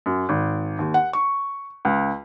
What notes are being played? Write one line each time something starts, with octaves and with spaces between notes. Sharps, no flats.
F#2
G#1
D#2
F#5
C#6
C#2